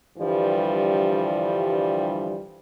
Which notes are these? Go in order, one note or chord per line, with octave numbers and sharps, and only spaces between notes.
G2 D3 E3 F3 G3